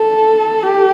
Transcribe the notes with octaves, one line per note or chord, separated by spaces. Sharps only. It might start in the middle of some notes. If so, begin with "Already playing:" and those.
Already playing: A4
G4